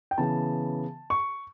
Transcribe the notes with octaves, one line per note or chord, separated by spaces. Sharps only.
G5
C#3 E3 B3 A5
C#6